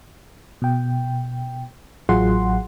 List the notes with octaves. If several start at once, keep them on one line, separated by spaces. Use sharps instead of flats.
B2 G5
A1 F#3 F4 G#4 F#5 C6